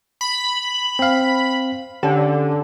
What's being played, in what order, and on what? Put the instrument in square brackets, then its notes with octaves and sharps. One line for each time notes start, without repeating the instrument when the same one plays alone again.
[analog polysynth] B5
[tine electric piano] C4 F5
[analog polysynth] D3 [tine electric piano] C#4 G4